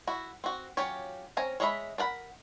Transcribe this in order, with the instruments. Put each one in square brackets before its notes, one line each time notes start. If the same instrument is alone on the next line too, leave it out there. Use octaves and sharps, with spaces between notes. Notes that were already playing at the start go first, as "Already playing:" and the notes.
[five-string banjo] E4 F#4
C4 F#4
F#3 C#4 F4 G4 C#5
C4 C#4 G#5 A#5
G#3 C#5 D#5 E5 B5
D4 A#4 F#5 B5